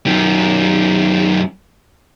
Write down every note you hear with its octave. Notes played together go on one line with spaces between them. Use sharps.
F#2 D#3